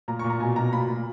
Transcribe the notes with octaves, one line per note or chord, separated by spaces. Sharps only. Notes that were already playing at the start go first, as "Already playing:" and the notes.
A#2 A#5
C#6
A#2
A#5
B2 G#5
B2 A#5
A#2 B5
A#2